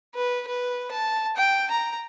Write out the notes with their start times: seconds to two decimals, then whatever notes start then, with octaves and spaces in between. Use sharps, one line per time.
0.15 B4
0.47 B4
0.91 A5
1.37 G5
1.71 A#5